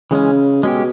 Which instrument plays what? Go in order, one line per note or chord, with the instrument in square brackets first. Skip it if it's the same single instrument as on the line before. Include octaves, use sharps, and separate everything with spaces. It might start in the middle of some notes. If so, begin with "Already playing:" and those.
[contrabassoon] C#3 [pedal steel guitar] E3 G#3 C#4
[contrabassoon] B2 [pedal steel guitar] G#3 C#4 G4